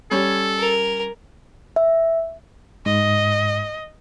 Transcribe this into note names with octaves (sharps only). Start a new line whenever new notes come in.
G3 C#4 A4 C#5
A#4
E5
G#2 D#5